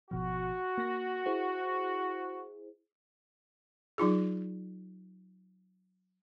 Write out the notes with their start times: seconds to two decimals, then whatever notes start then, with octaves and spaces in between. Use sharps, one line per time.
0.11 G#1 B2 F3 F#4
0.78 A#3 A#6
1.26 E4 G#4 C5
3.98 F#3 D#4 F4 G#4